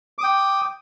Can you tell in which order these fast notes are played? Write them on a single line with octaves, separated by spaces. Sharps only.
D6 D#6 G5